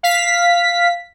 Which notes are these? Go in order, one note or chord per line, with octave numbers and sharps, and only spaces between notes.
F5 B6